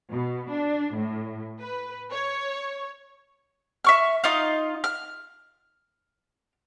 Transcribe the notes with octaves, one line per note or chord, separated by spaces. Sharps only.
B2
D4
A2
B4
C#5
E5 C#6 F6
D#4 F4 D#5 F5
F6